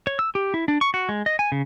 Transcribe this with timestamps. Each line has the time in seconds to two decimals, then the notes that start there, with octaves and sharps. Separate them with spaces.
0.07 C#5
0.19 E6
0.35 G4
0.54 E4
0.68 D4
0.81 C#6
0.94 F#4
1.09 G#3
1.26 D#5
1.39 G#5
1.52 C#3